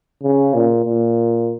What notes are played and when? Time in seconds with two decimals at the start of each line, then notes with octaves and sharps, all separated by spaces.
0.23 C#3
0.54 A#2
0.85 A#2